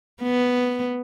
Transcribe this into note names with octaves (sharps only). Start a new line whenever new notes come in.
B3